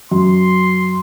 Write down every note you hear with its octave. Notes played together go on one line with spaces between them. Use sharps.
F#2 C6